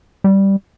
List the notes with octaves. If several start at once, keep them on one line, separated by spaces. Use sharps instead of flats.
G3